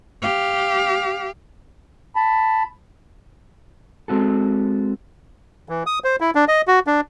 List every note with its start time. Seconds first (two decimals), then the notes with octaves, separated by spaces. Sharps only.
0.22 G4 F5
2.16 A5 B5
4.08 G#3 C4 F#4 A4
5.69 E3
5.86 D#6
6.04 C5
6.20 E4
6.35 D4
6.48 D#5
6.68 F#4
6.87 D4